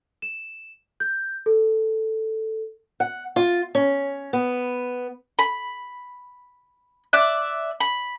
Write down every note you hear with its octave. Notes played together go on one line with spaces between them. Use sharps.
E7
G6
A4
F#5
F4
C#4
B3
B5
D5 E5 F#6
B5